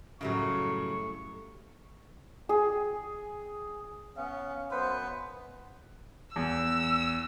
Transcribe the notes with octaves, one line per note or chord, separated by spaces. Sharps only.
F#2 A2 C#3 F#3 G3 C#6
G#4
B3 C#4 F5
F#2 B3 B4 C5
E2 E6